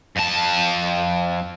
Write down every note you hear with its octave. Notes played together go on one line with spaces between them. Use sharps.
F2 A5